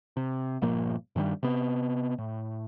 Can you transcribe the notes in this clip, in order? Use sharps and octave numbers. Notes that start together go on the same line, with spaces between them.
C3
G1 A#2 F3 A#3
G2 D#3 F3 G3
C3 B3
A2